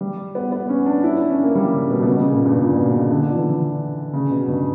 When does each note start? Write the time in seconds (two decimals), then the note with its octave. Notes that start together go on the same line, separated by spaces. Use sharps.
0.01 G3
0.35 B3
0.52 B3
0.69 C#4
0.86 D4
1.03 E4
1.17 D4
1.29 C#4
1.43 A#3
1.55 G3
1.72 C#3
1.90 B2
2.02 B2
2.07 C#3
2.19 C#3
2.32 A#2
2.45 G2
2.59 A#2
2.76 B2
2.93 C#3
3.10 D3
3.36 E3
4.13 C#3
4.31 B2
4.47 G2